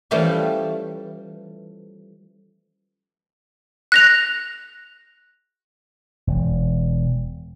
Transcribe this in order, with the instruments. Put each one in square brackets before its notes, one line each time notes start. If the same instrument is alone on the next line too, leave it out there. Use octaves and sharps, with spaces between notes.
[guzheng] E3 F3 G3 A3 C#4
[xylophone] F#6 A#6 F7
[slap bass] E1